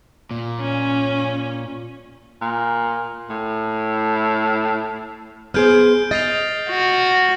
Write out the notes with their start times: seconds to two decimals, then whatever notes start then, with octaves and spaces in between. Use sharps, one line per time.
0.31 A#2
0.61 C#4
2.41 A#2
3.30 A2
5.54 B3 G#4 C5 F6 G6 D7
6.11 D#5 A6 C7 F7
6.70 F#4